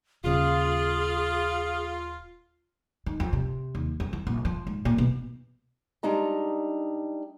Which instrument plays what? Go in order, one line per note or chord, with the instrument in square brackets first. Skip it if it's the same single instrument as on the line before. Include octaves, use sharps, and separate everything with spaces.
[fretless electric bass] D#1 C#3 [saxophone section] F4 [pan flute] G#4
[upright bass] D#3
F2
C3
D#2
F2
E3
A#1
F3
G#2
A#2
B2
[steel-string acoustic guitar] G3 G#3 D4 D#4 A#5